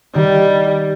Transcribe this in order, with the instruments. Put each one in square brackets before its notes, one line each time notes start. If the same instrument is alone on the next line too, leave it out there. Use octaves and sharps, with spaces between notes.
[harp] D#3 [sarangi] G3